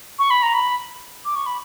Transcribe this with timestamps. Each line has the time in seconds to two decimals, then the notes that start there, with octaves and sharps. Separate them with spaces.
0.19 C#6
0.31 B5
0.43 A#5
0.54 B5
1.25 D6
1.36 C#6
1.46 B5